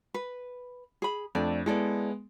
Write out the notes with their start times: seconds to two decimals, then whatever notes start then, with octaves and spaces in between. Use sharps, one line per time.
0.14 B4
1.02 G#4 B5
1.35 F2 A3 D4 D5
1.66 G#3 B3 E4 A4 D5